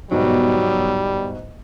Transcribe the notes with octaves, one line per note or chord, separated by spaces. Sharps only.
G1 G#2 B2 F#3 G3